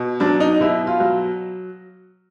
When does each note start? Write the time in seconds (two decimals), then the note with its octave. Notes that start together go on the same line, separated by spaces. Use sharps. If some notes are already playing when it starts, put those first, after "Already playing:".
Already playing: B2
0.20 F#3 D4
0.40 D#4
0.61 B2 E4
0.87 F4
1.00 F#3